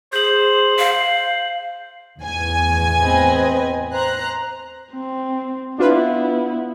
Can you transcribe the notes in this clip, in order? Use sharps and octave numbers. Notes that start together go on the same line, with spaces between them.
G#4 C5 G6 F#7
F5
E2 A2 G#5
C4 B4 D#5
C5 A#5 F#6
C4
B3 D4 E4 F4 B4